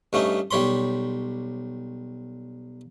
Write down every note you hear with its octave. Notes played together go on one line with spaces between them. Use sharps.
G2 A3 C#4 D#4
B1 G3 C#5 B5 C6